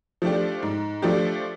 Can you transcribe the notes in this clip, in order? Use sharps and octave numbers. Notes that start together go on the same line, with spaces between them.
F3 A3 D4 G4
G#2
F3 A3 D4 G4